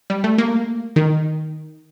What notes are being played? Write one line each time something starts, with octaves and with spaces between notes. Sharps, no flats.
G3
A3
A#3
D#3